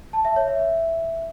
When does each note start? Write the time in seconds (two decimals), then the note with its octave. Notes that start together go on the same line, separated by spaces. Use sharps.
0.13 A5
0.25 E5
0.36 C#5
0.48 E5
0.59 E5